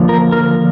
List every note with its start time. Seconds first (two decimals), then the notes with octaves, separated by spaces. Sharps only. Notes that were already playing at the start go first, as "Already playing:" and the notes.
Already playing: D3 F3 A#3
0.09 A#4
0.32 A#4